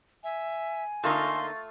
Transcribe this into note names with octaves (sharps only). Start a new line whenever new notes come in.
E5 G#5
D3 A3 A#3 D#4 F4 C6 E6